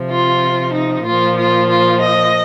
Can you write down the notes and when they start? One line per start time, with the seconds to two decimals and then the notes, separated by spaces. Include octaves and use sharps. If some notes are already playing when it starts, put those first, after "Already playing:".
Already playing: C3 F3
0.10 F4
0.73 D#4
1.05 A#2 F3 F4
1.37 F4
1.69 F4
2.01 D#5